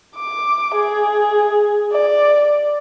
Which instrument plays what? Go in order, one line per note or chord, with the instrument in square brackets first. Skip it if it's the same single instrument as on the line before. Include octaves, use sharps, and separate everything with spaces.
[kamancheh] D6
G#4
D5